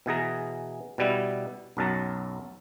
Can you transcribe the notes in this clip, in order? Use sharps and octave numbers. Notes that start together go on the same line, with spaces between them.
B2 E3 G#4 A#5
B2 G3 E4
B1 F#2 F#3 A5 A#5